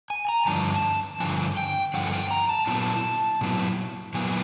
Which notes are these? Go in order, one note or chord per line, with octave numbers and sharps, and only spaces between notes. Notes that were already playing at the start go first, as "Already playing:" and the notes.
G#5
A#5
G2 D3 F3 A5
G2 D3 F3 G#5
G5
G2 D3 F3 F#5
G#5
G5
A#5
A5
A#2 F#3 B3 E4 A5
A#2 F#3 B3 E4
A#2 F#3 B3 E4 G#5